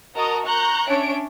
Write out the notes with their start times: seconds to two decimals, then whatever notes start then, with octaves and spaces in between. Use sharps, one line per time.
0.15 F#4 A#4 D#5 A5 A#5 D#6
0.46 A#5 C#6 F#6 G6
0.88 C#4 D4 C#5 E5 D7